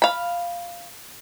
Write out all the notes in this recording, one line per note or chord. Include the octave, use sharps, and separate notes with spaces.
F5 B5